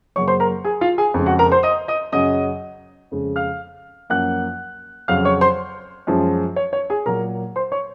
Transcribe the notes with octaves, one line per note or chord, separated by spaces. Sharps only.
F#2 C#3 F#3 A#3 C#5 C#6
C5 C6
A#4 A#5
G#4 G#5
F4 F5
G#4 G#5
F2 C#3 G#3
F#4 F#5
A#4 A#5
C5 C6
D#5 D#6
D#5 D#6
F#2 C#3 F#3 D#5 D#6
F2 C#3 G#3
F5 F6
F#2 F3 A#3 F#5 F#6
F2 C#3 F#3 F5 F6
C#5 C#6
C5 C6
F#2 F3 G#3
C#5
C#5
G#4 G#5
A#2 F#3 A#3 A#4 A#5
C5 C6
C#5 C#6